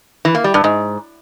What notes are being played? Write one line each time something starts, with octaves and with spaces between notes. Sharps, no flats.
E3
A#3
G3
G2
G#2